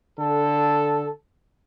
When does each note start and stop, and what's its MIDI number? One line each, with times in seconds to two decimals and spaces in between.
0.18 1.06 50
0.18 1.06 69